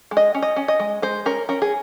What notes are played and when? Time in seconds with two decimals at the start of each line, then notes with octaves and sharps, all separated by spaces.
0.11 G#3
0.17 D#5
0.34 C#4
0.42 D#5
0.56 C#4
0.68 D#5
0.80 G#3
1.02 G#3 C5
1.26 C#4 A#4
1.49 C#4 A#4
1.62 G#4